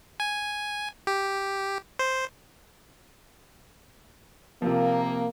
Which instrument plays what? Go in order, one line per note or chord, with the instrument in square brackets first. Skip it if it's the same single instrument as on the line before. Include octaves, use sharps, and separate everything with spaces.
[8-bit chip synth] G#5
G4
C5
[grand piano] C3 F3 [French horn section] A#3